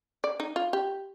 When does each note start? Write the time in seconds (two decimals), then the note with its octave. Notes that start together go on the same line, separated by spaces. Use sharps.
0.24 D5
0.40 D#4
0.56 F4
0.73 G4